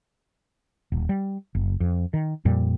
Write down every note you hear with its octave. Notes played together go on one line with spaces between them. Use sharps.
D#1
G3
F#1
F2
D#3
F2 A#2 G3